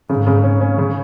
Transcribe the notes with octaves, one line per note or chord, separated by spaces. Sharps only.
G#2 C#3
C#3
C#4
C#4
C#3